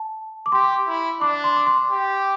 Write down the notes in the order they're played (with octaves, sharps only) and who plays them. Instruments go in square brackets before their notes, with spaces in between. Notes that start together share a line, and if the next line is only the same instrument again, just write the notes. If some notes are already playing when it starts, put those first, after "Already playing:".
Already playing: [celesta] A5
D6
[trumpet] G4 [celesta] C6
[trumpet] E4
[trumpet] D4 [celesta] D6
[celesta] C6
D6
C6
[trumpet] G4